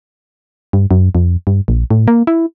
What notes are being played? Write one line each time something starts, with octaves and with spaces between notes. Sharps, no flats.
G2
F#2
F2
G2
A#1
A2
A#3
E4